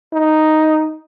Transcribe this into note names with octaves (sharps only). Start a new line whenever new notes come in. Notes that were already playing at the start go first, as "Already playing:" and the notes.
D#4